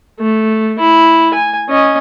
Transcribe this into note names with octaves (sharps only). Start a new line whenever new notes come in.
A3
E4
G#5
C#4 D#5